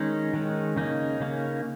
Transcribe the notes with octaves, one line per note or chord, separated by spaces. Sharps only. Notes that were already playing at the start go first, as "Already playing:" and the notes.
Already playing: D#3 G#3 C#4 D#4
D#3 G#3 C#4
C#3 A#3 C#4 D#4
C#3 A#3 C#4